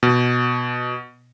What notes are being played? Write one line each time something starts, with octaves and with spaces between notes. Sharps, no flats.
B2